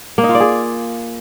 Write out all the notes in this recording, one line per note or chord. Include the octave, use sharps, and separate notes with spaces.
A#3
D#4
F4
D5
G#4